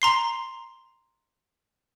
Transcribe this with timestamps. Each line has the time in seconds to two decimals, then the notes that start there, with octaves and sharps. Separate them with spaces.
0.02 A#5 C6 C7